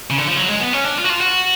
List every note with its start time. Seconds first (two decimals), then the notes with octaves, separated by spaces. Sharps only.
0.10 C#3
0.18 D3
0.27 F3
0.36 F#3
0.48 G#3
0.60 B3
0.73 C#4
0.84 D4
0.98 F4
1.04 F#4
1.10 F4
1.21 F#4